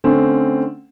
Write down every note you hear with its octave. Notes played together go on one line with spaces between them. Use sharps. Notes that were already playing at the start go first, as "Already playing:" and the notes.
D3 A3 C4 C#4